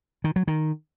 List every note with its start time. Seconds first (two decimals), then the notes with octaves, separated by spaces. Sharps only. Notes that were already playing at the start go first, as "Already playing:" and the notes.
0.24 D#3
0.36 F#3
0.48 D#3